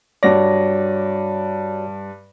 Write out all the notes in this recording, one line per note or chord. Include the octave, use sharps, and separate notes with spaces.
G2 F#4 C#5 D5 A#6